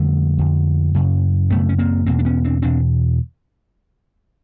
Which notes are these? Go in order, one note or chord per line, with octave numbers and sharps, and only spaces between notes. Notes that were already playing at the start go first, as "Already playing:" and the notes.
Already playing: F2 D3 G3 A3
F2 D3
F#2 C#3
F#2 C#3 A3 B3
C#4
A#3 C4
E2 B2 A#3 C4
D4
B3 C#4
C4 D4
E2 B2 C4 D4